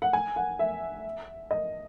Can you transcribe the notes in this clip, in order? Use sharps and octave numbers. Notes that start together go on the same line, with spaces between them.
F#5
G#5
F#5
E5
D#5